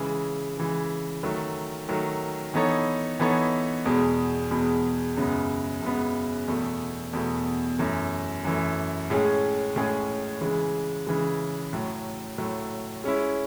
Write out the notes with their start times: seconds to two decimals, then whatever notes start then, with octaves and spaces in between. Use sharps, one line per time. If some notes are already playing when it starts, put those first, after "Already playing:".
Already playing: C#3 E3 G#3
0.57 C#3 E3 G#3
1.23 D#3 F#3 A3
1.89 D#3 F#3 A3
2.54 E3 B3 D#4 A4 C#5
3.20 E3 B3 D#4 A4 C#5
3.85 E2 B2 G#3
4.51 E2 B2 G#3
5.17 F#2 C#3 G#3 B3
5.82 F#2 C#3 G#3 B3
6.48 E2 B2 A3
7.13 E2 B2 A3
7.79 F#2 E3 A3
8.45 F#2 E3 A3
9.10 A2 G#3 C#4 G#4
9.76 A2 G#3 C#4 G#4
10.41 C#3 E3 G#3
11.07 C#3 E3 G#3
11.73 A2 F#3 A3
12.38 A2 F#3 A3
13.04 G#3 C#4 E4